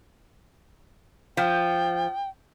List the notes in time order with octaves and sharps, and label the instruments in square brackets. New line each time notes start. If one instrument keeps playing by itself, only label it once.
[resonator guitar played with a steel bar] F3 [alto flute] G5